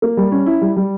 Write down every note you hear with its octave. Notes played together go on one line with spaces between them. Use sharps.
A#3
G3
C#4
E4
G3
G3